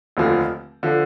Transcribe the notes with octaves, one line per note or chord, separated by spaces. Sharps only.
F1 D#2 D3 F3
D3 F3